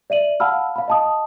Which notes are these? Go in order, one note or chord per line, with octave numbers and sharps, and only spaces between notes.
D5 E5 D#7 F#7
F5 F#5 A5 B5 E6 F6
F5 B5
D#5 A5 D#6